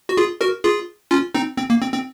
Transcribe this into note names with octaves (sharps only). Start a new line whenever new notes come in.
F#4
F4 G#4
F#4 A#4
F4 G#4
C#4 F4
C4 D#4
C4
A#3
C4
C4